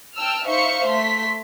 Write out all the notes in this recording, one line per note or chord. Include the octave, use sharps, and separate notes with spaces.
G5 A5 E6 F6
D#4 C5 E5 F5 C#6 C#7
A3 C6 B6